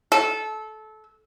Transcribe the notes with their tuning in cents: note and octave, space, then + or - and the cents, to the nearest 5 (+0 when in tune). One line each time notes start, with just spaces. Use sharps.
A4 -20